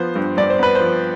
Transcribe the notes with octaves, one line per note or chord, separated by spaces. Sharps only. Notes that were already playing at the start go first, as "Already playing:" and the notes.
Already playing: F3 B3 C5
G2
G2 D5
C5
B3 B4
C5
F3